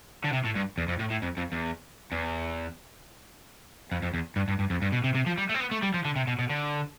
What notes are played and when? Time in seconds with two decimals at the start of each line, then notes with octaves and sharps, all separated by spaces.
0.24 D3
0.32 C3
0.44 A2
0.55 G2
0.78 E2
0.88 F2
1.00 A2
1.11 A2
1.22 F2
1.37 F2
1.52 E2
2.12 E2
3.92 F2
4.02 F2
4.14 E2
4.36 G2
4.48 G2
4.59 G2
4.70 F2
4.82 G2
4.92 B2
5.04 C3
5.15 C3
5.26 F3
5.38 G3
5.49 A3
5.54 C4
5.60 B3
5.71 A3
5.83 G3
5.94 F3
6.05 D3
6.16 C3
6.27 B2
6.39 B2
6.50 D3